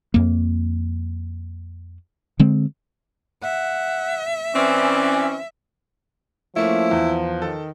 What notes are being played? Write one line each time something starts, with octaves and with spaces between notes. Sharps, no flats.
F2 A#3
D3 G#3 C4
E5 F#5
E3 C4 C#4 D5
F3 A3 A#3 C#4 E4
E2
D#3 A4